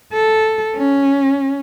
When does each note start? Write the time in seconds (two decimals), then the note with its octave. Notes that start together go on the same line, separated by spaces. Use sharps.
0.13 A4
0.76 C#4